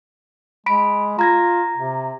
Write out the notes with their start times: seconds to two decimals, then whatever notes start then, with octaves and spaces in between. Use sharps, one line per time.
0.66 G#3 B5 B6 D7
1.19 F4 A#5 G#6 A#6
1.77 C3